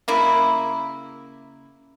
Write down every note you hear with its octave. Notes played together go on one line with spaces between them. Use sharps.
C#3 A#3 E4